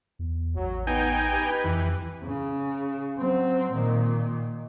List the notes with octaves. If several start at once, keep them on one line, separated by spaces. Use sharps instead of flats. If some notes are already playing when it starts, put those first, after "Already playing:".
E2
A1 F#3
B3 D#4 G5 G#5
G4 B4
F2 E3
C#3
F#3 C4
A#2 D#3